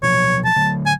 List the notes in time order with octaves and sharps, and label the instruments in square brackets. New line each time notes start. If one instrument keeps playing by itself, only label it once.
[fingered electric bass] B2 F3 F#3 [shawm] C#5
[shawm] A5
[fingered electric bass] D3 F#3 A3
[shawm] G#5